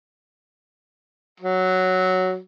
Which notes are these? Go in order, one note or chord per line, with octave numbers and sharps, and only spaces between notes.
F#3